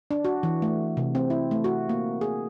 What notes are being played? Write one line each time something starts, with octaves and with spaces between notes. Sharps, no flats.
D4
F#4
E3
A3
C3
C4
E4
A3
F#4
A#3
G#4